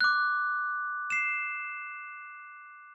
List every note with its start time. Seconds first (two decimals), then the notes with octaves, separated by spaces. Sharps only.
0.01 D6 F#6
1.10 C7 E7